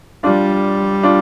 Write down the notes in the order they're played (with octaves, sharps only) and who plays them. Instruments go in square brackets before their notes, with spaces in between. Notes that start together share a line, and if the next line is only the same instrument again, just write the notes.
[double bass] G3 [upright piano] D4 F4
[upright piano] D4 F4